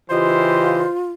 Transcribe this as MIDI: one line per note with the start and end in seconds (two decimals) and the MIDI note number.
0.10 0.84 49
0.10 0.84 52
0.10 1.12 65
0.10 0.83 67
0.10 0.96 72
0.10 0.83 75
0.10 0.83 77